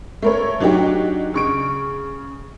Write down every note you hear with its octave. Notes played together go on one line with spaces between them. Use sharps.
A3 A#4 C#5
F#3 D4 D#4 F#4 G4
C#3 C#6 D7